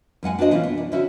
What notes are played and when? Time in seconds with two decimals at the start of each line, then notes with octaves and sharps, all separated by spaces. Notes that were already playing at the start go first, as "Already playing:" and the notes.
0.23 F#2 G#3 F#5 G#5
0.39 D4 F#4 B4 C5 D#5
0.51 B2 E3 A#3 C#4 F4
0.63 B3
0.78 D4
0.92 D3 C#4 E4 F#4